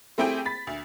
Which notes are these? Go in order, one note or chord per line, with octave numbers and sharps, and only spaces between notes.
A3 C4 E4 G4 G#4 G5
B5 A6 B6
D2